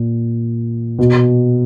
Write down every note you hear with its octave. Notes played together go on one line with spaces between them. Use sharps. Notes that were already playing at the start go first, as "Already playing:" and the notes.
Already playing: A#2
B2